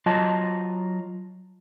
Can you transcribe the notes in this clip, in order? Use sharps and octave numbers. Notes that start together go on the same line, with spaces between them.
F#3 F4 D#5 A5